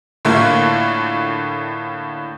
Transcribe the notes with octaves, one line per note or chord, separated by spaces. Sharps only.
A2 D3 A3 A#3 F4